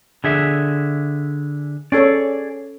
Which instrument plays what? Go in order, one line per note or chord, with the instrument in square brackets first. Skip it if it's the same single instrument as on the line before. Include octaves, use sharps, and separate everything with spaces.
[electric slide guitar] D3 G#4 E5
[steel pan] C#4 A4 C#5 [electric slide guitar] G#4 D5